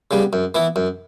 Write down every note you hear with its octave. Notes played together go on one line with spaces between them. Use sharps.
C#3 G3 B3
F#2
E3 B3 E4
F#2